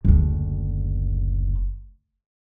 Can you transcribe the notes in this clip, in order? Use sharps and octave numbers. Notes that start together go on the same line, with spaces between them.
F#1 D2